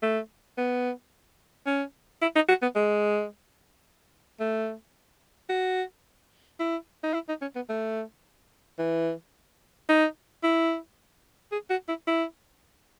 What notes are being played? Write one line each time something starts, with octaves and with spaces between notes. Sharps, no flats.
A3
B3
C#4
E4
D#4
F#4
B3
G#3
A3
F#4
E4
D#4
E4
D#4
C#4
B3
A3
E3
D#4
E4
G#4
F#4
E4
E4